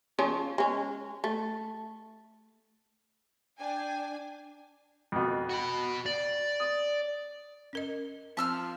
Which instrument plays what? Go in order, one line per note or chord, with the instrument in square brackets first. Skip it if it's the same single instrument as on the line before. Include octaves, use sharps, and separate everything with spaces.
[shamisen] C#3 F3 C#4
G#3 C#4
A3
[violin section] D4 G#5 [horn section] G5
[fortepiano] F2 B2
[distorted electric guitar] F#4 B5
D5
[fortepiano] D#6
[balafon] C#4 A#4 D#5
[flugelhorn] F3 [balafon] C4 [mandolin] A5 E6 F6